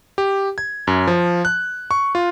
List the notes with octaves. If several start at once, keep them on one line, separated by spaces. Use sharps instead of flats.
G4
G#6
F#2
F3
F#6
C#6
F4